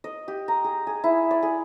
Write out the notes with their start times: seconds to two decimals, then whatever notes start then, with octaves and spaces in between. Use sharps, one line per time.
0.04 D#5
0.28 G4
0.48 A#5
0.64 G#4
0.87 G#4
1.04 E4
1.31 D5
1.43 G#4